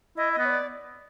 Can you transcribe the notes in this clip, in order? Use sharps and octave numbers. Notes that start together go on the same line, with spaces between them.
E4 D#5
D#5
B3
C#5
D5